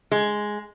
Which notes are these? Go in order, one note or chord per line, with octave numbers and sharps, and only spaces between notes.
G#3